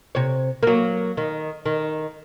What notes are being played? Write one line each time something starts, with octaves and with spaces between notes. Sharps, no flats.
C3 C#5
F#3 A#3
D#3
D#3